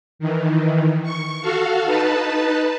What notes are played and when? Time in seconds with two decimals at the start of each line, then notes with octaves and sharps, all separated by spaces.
0.19 D#3 E3
1.03 C#6
1.41 F#4 A4 F5
1.85 D#4 B4 A5